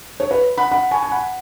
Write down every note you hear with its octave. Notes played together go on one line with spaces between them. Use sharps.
C#5
B4
F#5 B5
F#5 B5
G#5 C#6
G#5
F#5 B5